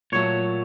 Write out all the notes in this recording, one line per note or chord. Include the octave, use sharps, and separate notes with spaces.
A#2 F#3 A3 C#5